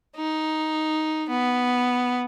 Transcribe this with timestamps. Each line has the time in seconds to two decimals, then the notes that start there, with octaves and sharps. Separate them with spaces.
0.16 D#4
1.29 B3